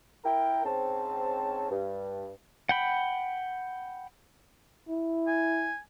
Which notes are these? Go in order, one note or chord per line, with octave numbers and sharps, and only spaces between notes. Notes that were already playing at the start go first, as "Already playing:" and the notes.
E4 A#4 G5
G#2 C4 C#4 A5
G2
F#5 G5 B5
E4
G#5